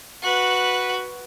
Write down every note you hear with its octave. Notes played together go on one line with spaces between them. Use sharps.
F#4 B4